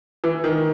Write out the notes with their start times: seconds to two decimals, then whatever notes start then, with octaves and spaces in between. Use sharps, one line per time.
0.24 E3
0.44 D#3